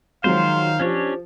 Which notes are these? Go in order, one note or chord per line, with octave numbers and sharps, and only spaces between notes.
D#3 F3 F#3 G#3 C5 F5 C6
F3 C#4 D4 G4 C#5